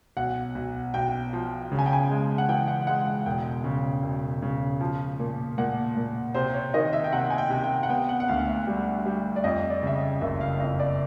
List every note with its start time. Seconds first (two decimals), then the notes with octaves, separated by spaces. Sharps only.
0.17 B1 F#5
0.55 B1
0.94 B1 G5
1.33 F3
1.72 C#3
1.79 G#5
1.86 G5
1.93 G#5
2.10 G#3
2.38 F#5
2.49 E3 G5
2.68 F#5
2.87 G#3 F#5
3.07 F#5
3.26 E1 G5
3.64 C#3
4.03 E1
4.42 C#3
4.81 F3
5.19 A#2
5.58 A#2 F#5
5.96 A#2
6.34 C3 C5
6.54 C#5
6.74 D#3 D#5
6.93 E5
7.04 G5
7.12 C3 F#5
7.30 G#5
7.38 G5
7.50 C3
7.64 G5
7.83 F#5
7.89 B3 G5
8.09 F#5
8.20 F#5
8.28 D2 F5
8.47 E5
8.67 G3
9.06 G3
9.36 D5
9.44 F2 D#5
9.70 D5
9.83 C#3 E5
9.95 D#5
10.21 F#1 E5
10.41 F5
10.60 F2 D#5
10.80 D5